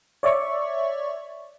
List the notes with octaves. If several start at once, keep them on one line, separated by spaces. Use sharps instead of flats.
C#5 D5 E5 C#6